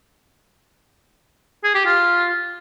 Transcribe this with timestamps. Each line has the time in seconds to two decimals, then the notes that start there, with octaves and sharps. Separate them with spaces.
1.64 G#4
1.74 G4
1.85 F4